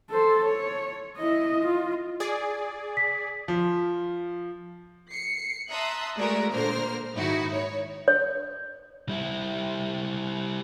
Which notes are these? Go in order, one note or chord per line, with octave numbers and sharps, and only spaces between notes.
A4 C5
C#5
E4 D#5
F4
G#4 D5
B6
F3
C7 C#7
E5 A5 A#5 C6 D#6 F#6
G#3 A3 F#4 A#4 D5 E5
A#2 D3 A#4 C5 F6
G#2 D#3 D#4 E4 F#4
C#5
C#5
G3 E4